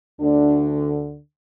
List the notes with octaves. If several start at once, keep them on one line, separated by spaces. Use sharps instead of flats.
D2 D3 D4